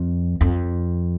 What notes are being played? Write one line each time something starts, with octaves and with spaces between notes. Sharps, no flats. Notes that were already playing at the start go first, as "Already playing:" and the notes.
Already playing: F2
F2